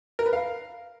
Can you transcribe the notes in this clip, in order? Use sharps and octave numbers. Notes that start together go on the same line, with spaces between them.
A#4
B4
F5